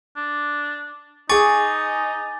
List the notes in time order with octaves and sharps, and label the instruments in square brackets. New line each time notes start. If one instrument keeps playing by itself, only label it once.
[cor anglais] D4
[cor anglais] D#4 [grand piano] G#4 C#6 [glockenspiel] G#5 D6 A6